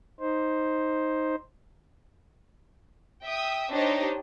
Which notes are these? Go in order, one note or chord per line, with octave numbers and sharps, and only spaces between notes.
D#4 C5
E5 G5 D#6
D4 D#4 G4 C5 C#5 D#5